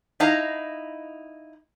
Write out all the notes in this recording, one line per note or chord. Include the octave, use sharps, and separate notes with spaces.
D#4 E4 D#5 F5 A#5